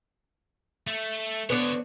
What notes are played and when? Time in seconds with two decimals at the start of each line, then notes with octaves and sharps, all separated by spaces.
0.87 A3
1.50 D3 B3 D4 C#5